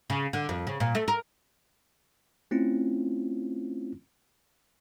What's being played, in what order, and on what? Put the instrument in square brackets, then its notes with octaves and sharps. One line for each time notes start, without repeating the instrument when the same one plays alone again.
[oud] C#3
D3
F2
C#3
A#2
A3
A#4
[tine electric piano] A3 C4 C#4 E4 F4